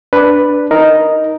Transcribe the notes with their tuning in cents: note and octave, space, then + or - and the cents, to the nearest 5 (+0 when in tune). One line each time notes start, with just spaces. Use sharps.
D4 +0 B4 +0
D#4 +0 A#4 +0